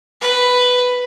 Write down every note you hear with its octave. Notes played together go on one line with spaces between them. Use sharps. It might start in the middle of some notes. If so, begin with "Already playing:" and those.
B4